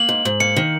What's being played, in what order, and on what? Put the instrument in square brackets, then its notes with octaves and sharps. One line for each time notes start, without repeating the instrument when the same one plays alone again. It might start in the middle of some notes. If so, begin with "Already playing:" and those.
Already playing: [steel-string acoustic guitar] A#3 [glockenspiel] F#7
[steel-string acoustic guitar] G#2
G#2
[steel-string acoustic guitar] A#3 [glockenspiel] C#7
[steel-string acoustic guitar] D#3